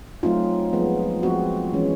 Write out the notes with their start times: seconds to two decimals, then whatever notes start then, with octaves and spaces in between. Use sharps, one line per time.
0.23 F#3 A3 C4 D#4 F4
0.73 F3 G#3 B3
1.23 F3 G#3 C4 F#4
1.73 E3 G#3 C#4